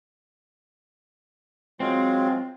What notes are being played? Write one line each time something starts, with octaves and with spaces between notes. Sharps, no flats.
F#3 G#3 C4 F4